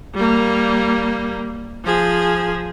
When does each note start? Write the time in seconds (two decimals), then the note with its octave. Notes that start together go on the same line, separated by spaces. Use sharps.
0.15 G3 A#3
1.84 F3 G#4